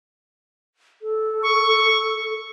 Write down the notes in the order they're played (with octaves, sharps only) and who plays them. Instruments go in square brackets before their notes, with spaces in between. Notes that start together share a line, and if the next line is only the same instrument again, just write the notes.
[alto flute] A4
[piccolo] C#6